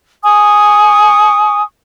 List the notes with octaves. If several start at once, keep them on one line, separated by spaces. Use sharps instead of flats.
G#5 C#6 D#6